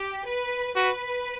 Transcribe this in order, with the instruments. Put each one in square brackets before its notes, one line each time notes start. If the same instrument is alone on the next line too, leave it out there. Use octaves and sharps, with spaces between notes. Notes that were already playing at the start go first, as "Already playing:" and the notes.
Already playing: [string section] G4
B4
[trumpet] F#4 [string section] B4